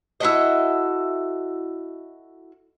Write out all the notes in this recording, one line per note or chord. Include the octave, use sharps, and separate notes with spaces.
E4 F#4 A4 D#5